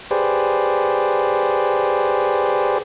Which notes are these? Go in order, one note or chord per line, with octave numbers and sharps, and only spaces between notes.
G4 G#4 B4 C5 D5